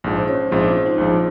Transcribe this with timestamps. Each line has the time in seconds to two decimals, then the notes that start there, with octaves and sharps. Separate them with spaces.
0.04 A#1 G#2 F3
0.17 C5
0.28 C#4 C#5
0.51 A#1 G#2 F3 C4 C5
0.64 F4
0.86 D#4
0.98 A#1 G#2 F3 F4